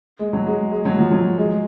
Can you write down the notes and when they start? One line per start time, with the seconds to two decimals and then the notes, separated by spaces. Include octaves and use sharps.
0.19 G#3
0.33 F#3
0.47 G#3
0.71 G#3
0.85 F#3
0.99 F3
1.11 F#3
1.38 G#3